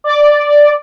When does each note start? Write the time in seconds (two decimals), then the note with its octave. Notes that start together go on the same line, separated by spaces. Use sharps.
0.04 D5